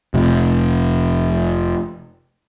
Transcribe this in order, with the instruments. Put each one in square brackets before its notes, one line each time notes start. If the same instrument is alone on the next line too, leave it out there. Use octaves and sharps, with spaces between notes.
[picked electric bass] F1 C3